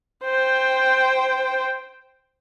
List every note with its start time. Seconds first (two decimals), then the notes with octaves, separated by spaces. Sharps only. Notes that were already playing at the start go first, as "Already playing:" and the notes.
0.24 C5 G5